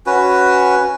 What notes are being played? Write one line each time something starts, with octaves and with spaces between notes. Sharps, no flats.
C#4 F#4 B4